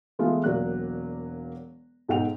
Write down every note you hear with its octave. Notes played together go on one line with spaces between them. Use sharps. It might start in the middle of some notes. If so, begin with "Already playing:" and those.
E3 G#3 A3 B3 F4
E1 F#3 A#3 D5 F#6
B1 G#2 A4 F#5 G5 F7